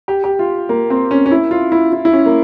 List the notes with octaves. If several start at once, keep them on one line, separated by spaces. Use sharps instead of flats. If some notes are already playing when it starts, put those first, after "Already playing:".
G4
G4
F4
A#3
C4
C#4
C#4
E4
F4
E4
E4
E4
C#4
A#3